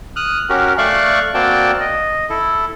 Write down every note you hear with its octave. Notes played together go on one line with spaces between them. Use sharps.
D#6 F6 F#6
C#4 F#4 G4 A#4
A3 D5 E5 F5 C#6 F#6
A#3 C4 F#4 D5 G5 A5
D#5
E4 A4